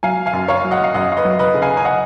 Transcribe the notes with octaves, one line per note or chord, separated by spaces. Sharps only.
F#3 F5 G#5
F5 G#5
F#2
C#5 F5
F#3
D#5 F#5
F5
F#2 D#5 F#5
F5
B4 D#5
F#3
B4 D#5
C#3
F5 G#5
G#5
D#5 F#5